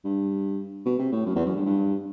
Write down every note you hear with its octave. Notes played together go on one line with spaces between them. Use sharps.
G2
B2
C3
A2
F#2
E2
F#2
G2
G2